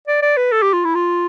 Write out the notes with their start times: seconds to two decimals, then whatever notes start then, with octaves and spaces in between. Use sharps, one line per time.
0.07 D5
0.22 D5
0.37 B4
0.52 A4
0.63 G4
0.73 F4
0.85 E4
0.95 F4